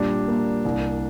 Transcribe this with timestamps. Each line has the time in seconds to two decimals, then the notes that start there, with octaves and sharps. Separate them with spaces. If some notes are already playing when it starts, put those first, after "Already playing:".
Already playing: A#2 G3 D4
0.28 A#3
0.65 C2